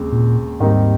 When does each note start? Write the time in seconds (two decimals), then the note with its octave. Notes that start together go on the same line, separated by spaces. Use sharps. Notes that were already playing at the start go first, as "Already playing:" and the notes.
Already playing: D#2 C#3 G#3 C4
0.12 A#2
0.60 D#2 G#2 D#3 G3 C4 D#4